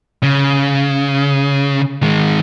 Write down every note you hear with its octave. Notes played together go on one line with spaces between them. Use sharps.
C#3
D#3 G#3